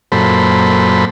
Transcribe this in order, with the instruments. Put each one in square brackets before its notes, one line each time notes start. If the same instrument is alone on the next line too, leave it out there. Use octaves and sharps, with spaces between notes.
[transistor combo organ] F#2 A#2 A4 C5 B5